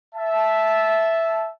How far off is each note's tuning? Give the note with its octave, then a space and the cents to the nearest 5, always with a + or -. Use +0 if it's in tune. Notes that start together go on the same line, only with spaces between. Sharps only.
E5 +0 A5 -15